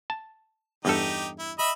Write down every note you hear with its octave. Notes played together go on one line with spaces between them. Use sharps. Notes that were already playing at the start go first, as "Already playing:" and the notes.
A5
E2 G2 D#4 G4 A4
E4
D#5 E5 B5